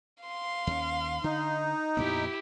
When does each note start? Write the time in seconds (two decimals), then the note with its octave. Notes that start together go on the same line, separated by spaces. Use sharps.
0.24 F5 C6
0.67 D#2 C#4
1.24 D3 D#4
1.97 F2 A#2 B3 E4 G4